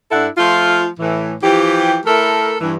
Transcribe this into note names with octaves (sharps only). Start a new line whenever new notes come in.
G2 D4 E4 A4 F#5
F3 A3 F4
A2 E3
E3 F3 G4
A3 E4 A4 A#4
G2 E3